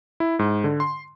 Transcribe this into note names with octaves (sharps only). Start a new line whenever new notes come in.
E4
G#2
D3
C6